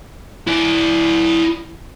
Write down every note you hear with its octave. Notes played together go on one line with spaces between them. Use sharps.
E4 D5